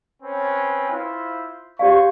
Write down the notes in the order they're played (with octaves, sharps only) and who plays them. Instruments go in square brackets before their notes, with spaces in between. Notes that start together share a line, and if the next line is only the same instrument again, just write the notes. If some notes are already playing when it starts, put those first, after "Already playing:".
[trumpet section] C4 C#4 B4
E4 F4 C5
[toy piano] G4 D5 F5 [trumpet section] C5 C#6